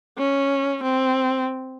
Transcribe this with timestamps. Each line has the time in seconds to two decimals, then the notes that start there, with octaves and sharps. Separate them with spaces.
0.18 C#4
0.83 C4